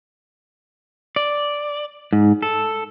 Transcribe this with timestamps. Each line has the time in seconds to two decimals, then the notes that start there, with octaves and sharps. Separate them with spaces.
1.16 D5
2.13 G#2
2.42 A4